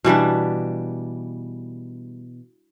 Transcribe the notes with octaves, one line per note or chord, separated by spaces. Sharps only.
B2 E3 G3 D4